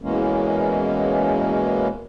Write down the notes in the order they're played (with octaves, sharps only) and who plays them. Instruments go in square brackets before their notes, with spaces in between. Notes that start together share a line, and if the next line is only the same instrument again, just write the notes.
[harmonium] E2 B2 E3 G#3 A#3 C#4